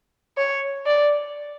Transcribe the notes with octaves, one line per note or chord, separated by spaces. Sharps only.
C#5
D5